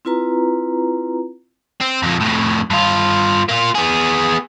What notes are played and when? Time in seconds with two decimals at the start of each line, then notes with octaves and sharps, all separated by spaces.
0.05 C4 E4 F4 B4 A#5
1.81 C4
2.02 F2 A#2
2.20 F2 A2
2.70 G2 F4
3.49 A#3 F4
3.75 B3 G#4